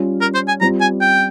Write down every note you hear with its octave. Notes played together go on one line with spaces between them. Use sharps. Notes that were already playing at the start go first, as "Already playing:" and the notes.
Already playing: G3 C#4 F4
A#4
C5
G#5
G3 C4 F4 A#5
G#5
G5